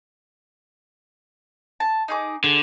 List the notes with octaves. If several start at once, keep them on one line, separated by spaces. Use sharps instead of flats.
A5
D#4 G#4 D6
D3 G#4